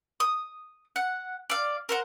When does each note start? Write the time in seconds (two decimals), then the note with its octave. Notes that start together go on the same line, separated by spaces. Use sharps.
0.20 D#6
0.96 F#5
1.50 D5 F5
1.89 A#4 C5 F#5